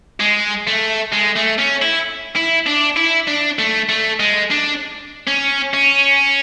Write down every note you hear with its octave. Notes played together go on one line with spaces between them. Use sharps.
G#3
A3
G#3
A3
C#4
E4
E4
D4
E4
D4
A3
A3
G#3
D4
C#4
C#4